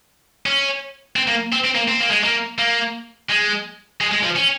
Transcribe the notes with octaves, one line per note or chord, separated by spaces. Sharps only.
C#4
C4
A#3
C4
C4
A#3
C4
A#3
G#3
A#3
A#3
G#3
G#3
G#3
F3
C#4